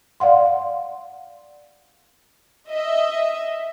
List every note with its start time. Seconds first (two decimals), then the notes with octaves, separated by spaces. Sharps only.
0.20 D5 F5 F#5 C6
2.69 D#5 E5